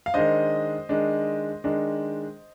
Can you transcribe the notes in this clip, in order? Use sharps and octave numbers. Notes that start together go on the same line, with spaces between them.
F5
D#3 G#3 D4 C5 D#5
D#3 G#3 D4
D#3 G#3 D4